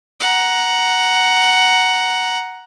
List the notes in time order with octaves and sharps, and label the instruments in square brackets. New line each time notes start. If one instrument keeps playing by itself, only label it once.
[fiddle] F#5 A#5